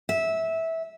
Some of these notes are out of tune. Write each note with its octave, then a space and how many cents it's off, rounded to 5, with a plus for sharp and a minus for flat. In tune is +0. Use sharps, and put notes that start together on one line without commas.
E5 -15